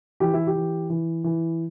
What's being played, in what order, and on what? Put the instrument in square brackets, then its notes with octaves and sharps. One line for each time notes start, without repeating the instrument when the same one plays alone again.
[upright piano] E3 G4
E4
G4
E3
E3
E3